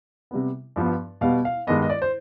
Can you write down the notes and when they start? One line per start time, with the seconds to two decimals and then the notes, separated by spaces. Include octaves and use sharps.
0.31 C3 G3 B3
0.76 G2 F3 B3
1.21 B2 G3 B3 F5
1.45 F5
1.67 G2 D#3 G#3 B3 D#5
1.82 D#5
1.90 D5
2.02 C5